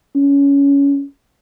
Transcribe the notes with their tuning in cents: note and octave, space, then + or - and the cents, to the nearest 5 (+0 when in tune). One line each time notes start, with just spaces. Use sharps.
C#4 +20